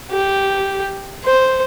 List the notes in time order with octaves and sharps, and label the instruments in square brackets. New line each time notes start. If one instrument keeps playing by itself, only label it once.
[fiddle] G4
C5